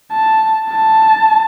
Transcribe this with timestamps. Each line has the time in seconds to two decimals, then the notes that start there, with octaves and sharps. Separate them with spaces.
0.12 A5
0.70 A5